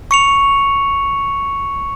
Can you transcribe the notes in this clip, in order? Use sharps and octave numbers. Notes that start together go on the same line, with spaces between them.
C#6 C#7 F7